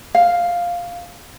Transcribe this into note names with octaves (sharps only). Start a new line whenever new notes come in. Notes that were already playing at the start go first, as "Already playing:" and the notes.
F5